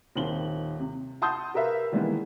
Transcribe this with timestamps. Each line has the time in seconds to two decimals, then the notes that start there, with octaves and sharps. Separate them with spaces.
0.15 D#1 D#3 C4 F#7 G7
0.80 C3
1.22 F#5 A5 C6 D#6 G6
1.54 G4 A#4 B4 E5 F5
1.92 D#3 E3 G3 G#3 A#3 B3